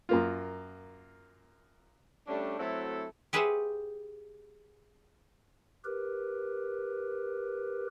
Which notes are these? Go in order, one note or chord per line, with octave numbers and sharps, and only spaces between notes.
F#2 A#3 F4
G3 A3 C#4 D4
F#3 A3 C4 E4 F#4 A4
G4 G#4 B4 C5 E5 F#5
G4 A#4 B4